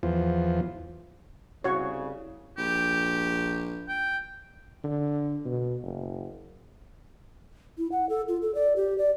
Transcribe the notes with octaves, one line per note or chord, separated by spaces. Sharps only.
E2 F3
C2 C#3 F#4 C#5
A#1 G4
G5
D3
B2
F#1
E4
F#5
A4
F4
A4
D5
G4
D5